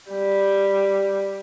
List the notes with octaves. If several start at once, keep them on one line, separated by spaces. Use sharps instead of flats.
G3